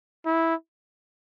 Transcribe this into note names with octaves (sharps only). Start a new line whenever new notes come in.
E4